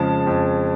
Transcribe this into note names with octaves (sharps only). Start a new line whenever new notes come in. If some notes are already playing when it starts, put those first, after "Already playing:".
Already playing: F2 C#3 F3 G#3 A5
F2